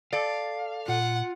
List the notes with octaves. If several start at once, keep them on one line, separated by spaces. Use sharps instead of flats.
A4 D5 F5
A#2 F4 F#5